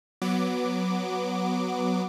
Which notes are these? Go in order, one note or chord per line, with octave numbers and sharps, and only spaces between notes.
F#3 B3 D6